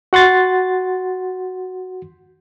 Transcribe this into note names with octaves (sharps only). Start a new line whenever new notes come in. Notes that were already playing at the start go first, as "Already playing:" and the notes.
F#4 F#5 C6 A6